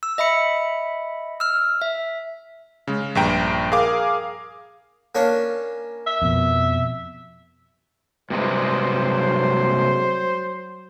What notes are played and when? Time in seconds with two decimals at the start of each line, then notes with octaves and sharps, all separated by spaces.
0.03 E6
0.18 D#5 E5 B5 C#7
1.40 E6 F6
1.81 E5
2.87 C#3 G#3
3.15 A#1 G2 G5 A#5
3.72 G#4 A#4 F5 D6
5.15 A#3 C#4 D4
6.07 E5
6.22 F2 B2
8.30 G2 C3 F#3 G#3 C5